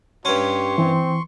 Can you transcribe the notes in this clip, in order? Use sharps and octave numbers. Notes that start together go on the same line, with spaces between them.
G2 C#4 G4 C6 C#6
E3 C4